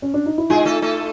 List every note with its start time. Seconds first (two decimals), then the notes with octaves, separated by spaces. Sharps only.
0.02 C#4
0.14 D4
0.26 D#4
0.38 E4
0.50 G#3 D#4 F4 G#4
0.65 A3 A4
0.82 A3 A4